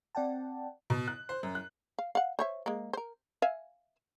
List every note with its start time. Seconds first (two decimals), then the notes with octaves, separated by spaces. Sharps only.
0.15 C4 D5 F#5 G5 A5
0.90 B2
1.08 F#6
1.29 C5
1.43 F#2
1.55 F#6
1.99 F5
2.15 F5 F#5
2.39 C5 C#5 E5
2.66 G#3 A#3
2.93 A#4 C5
3.42 E5 F5 G#5